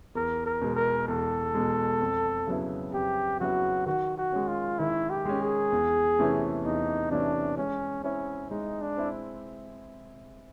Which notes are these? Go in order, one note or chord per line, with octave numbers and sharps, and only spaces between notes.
E2 A#4
A#4
B2 G#3
A#4
E2 A4
B2 G#3
F2
C#3 F#3 B3 E4
F2 G4
C#3 F#3 B3 E4 F#4
D#3 F#4
F#4
G#3 C#4
F4
D#3 E4
G4
G#3 C#4
G#4
E2
C3 E3 A3 C#4
E2 D#4
C3 E3 A3 C#4 D4
G#3 C#4
C4 C#4 E4
G#3 D#4
D4
C4 E4